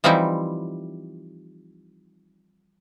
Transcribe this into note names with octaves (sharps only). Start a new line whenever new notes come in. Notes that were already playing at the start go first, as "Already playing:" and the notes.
E3 F3 G3 C4 D#4 E4